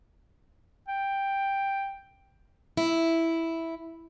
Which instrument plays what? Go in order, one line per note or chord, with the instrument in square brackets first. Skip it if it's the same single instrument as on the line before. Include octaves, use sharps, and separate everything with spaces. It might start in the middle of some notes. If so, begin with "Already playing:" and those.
[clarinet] G5
[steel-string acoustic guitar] E4